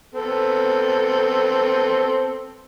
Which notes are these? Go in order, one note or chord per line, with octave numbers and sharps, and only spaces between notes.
B3 C4 A4